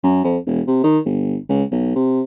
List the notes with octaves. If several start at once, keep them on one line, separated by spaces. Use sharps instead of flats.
F#2
F2
E1
C3
D#3
G1
C#2
B1
C3